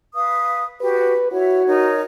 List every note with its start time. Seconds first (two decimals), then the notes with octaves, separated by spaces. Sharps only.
0.15 B4 F5 D#6
0.81 F#4 G4 B4
1.32 E4 F#4 C#5 E5
1.66 D#4 A#4 C#5